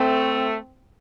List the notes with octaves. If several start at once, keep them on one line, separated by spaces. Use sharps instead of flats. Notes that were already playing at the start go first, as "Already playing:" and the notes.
Already playing: A3 C4